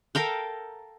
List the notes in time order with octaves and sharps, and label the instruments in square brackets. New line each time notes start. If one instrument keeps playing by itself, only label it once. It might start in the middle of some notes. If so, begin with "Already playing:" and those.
[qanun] A4 A#4 F5 G5